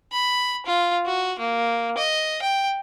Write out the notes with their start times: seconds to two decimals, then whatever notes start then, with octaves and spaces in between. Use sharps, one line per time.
0.12 B5
0.66 F4
1.06 F#4
1.39 A#3
1.98 D#5
2.42 G5